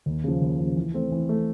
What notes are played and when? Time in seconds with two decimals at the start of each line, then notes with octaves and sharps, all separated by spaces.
0.06 D#2
0.24 C#3 F3
0.42 D#2
0.59 C#3 F3
0.76 E3
0.94 A3 C4
1.12 E3
1.29 A3 C4